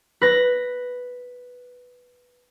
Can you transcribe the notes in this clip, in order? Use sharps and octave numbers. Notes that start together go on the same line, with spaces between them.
B4 A#6